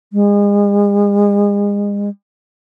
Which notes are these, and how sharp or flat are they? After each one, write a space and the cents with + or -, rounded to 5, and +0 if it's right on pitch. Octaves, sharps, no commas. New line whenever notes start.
G#3 -35